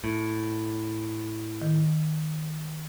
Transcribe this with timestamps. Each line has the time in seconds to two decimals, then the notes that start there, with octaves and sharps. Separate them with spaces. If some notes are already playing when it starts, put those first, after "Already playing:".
0.04 A2
1.62 D#3